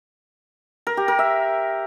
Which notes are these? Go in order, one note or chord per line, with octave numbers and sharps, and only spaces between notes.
A#4
G4
A#4
E5